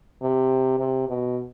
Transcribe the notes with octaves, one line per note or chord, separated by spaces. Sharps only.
C3
C3
B2